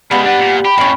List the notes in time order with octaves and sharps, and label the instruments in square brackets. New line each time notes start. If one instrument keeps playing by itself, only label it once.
[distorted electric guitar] C#3 G#3 [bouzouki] G3 B3 [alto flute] B5
[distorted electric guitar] D4 B4 [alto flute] F#5
[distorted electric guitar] A#2
[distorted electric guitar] G4 [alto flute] B5
[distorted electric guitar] F2 A2 [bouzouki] C#4 G5